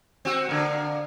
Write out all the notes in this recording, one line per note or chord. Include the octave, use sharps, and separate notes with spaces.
C4 F#4
D3 A#3